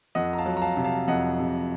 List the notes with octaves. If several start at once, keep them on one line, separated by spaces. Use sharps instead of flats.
F2 D#5 F#5
A#5
F5 A5
F#3
A#5
F5 A5
C3
F5 A5
F2 D#5 F#5
C3